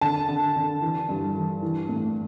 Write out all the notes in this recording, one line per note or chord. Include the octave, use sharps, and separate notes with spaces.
D3 A5
D3
D3
E3
G2
E3
E3
A2